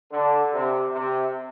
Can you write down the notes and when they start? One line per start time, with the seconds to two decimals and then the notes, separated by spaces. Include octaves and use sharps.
0.12 D3
0.53 C3
0.93 C3